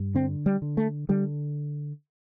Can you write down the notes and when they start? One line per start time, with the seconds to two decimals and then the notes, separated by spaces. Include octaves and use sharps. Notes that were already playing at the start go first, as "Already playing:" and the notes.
Already playing: G2
0.15 D3 C4
0.46 G3
0.62 D3
0.77 A3
1.09 D3 G3